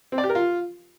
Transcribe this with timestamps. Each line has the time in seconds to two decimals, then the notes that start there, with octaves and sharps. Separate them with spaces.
0.12 C4
0.18 D5
0.24 G4
0.29 A#4
0.35 F4